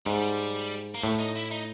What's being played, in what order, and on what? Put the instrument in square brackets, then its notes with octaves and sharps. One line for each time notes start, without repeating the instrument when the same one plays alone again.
[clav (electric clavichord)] G#2 [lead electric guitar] G3
[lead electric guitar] A#3
[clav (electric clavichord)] A2 [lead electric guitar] A3
[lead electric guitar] D#4
E4
D#4